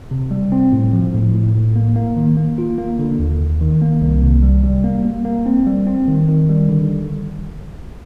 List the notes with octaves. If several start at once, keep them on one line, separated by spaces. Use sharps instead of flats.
C3
G3
C4
A2
F3
A2
A2
A2
A#3
A#3
D#3
A#3
F4
A#3
D3
D#2
D#2
D#3
A#3
C2
C3
G3
G3
A#3
A#3
A#3
C4
G3
C4
D#3
D#3
G3
D3